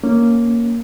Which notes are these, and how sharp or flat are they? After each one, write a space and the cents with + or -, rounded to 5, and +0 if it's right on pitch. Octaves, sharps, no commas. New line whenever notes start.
A#3 +0 C#4 +0